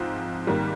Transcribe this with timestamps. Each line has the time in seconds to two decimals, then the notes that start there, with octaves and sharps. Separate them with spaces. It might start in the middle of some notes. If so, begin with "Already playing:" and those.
Already playing: G#2 F3 C4 F4
0.47 G#2 D#3 G3 A#3